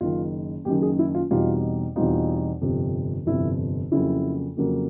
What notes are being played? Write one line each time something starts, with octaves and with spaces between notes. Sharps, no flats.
F#1 F#2 D#3 F4
F#1 F#2 D#3 G4
G#4
E4
F4
E2 B2 G3 C4 D#4 F4
E2 B2 G3 C4 D#4 F4
G1 F2 C3
G1 F2 C3 E4
F2 C#3 F#3 A#3 E4
F2 C#3 F#3 A#3